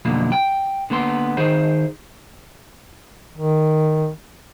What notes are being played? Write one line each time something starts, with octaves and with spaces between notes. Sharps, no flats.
B1 F2 B2 D3 A#3
G5
D3 A#3 B3 C6
D#3 D#4 G#4 C5
D#3